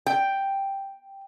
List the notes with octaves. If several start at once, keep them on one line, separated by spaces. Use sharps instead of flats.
G5